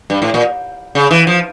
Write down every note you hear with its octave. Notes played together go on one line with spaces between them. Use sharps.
G2
A2
A#2
C#3
E3
F3